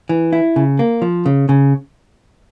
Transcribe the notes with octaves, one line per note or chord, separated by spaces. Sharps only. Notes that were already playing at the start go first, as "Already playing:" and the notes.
E3
E4
C#3
A#3
F3
C#3
C#3